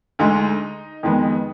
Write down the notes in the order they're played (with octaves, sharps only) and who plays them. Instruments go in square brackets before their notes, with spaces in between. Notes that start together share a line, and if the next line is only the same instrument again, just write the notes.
[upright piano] D2 D3 G#3 D#4
F2 D#3 G#3 B3